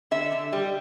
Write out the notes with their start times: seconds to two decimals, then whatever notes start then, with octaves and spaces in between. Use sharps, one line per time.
0.11 D3 E5
0.32 D3
0.53 G3